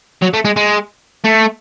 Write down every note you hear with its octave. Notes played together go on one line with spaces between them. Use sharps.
F#3
A3
G#3
G#3
A3